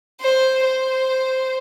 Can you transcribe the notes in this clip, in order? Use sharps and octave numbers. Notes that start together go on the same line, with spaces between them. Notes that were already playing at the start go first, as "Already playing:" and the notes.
C5
C5